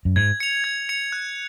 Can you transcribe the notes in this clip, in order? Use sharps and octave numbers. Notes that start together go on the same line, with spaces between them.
F#2
G#2 G#6
C#7 F7
G#6
C#7 F7
F#6